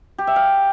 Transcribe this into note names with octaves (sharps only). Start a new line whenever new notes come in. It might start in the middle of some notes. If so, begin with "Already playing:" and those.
G4
E5
F5